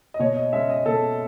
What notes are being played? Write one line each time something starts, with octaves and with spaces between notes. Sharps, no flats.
D#5
B2 C#5
D#5
G#3 C#4 E5
D#5
B2 A4